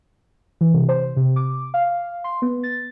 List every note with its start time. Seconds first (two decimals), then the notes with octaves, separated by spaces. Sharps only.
0.61 E3
0.74 C3
0.89 C5
1.17 C3
1.36 D6
1.74 F5
2.24 C6
2.42 B3
2.63 A6